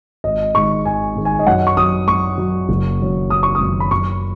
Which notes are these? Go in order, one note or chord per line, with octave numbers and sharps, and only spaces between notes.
G#1 D#5
G#2 D#3 G#3 C#6
G#1 G#5
G#2 D#3 G#3
G#5
D#5
F#2 F#5
C#6
F#3 D#6
F#2 C#6
F#3
F#1
F#2 D#3
F#1 D#6
C#6
D#6
F#2 D#3
B5
F#2 C#6